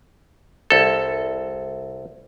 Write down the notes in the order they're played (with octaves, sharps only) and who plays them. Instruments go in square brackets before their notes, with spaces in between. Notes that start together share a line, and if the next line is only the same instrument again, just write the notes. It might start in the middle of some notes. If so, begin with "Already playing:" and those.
[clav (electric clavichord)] C2 A4